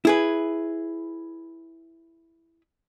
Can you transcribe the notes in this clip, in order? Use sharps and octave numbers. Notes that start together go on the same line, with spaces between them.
E4 G#4 B4